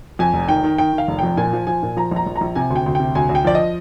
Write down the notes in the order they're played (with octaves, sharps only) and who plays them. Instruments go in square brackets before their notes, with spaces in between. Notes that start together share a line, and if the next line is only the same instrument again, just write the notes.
[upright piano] F2 G#5
F1
D#3 G5
D#3
D#3 G5
D#3 F5
F1
F2 G5
A#2 G#5
F3
F3 G#5
A#2
F3 A#5
A#1 A#5
A#1
A#5
A#1
C3 G#5
D2
G5
D2
C3 G5
D2 G#5
D2
G5
F3 D5
D#5